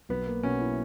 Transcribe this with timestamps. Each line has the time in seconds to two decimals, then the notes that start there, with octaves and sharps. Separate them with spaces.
0.09 B1 B3
0.27 A#3
0.43 B2 C#4
0.61 E4